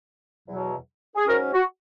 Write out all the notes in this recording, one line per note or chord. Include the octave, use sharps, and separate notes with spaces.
E2 B2 F#3
G#4
G#2 F#3 C#4 F#4 A#4
F#4